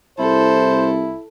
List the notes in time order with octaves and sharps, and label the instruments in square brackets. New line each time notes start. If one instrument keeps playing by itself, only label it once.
[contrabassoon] C2 [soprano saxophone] E4 [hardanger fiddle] A4 [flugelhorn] C5